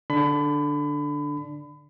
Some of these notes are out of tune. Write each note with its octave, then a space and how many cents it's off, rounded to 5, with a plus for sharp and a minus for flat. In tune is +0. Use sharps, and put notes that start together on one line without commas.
D3 +0 D4 +0 B5 +30